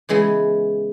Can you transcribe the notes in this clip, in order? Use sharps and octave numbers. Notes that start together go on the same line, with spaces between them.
C#3 E3 G#3 B3 E4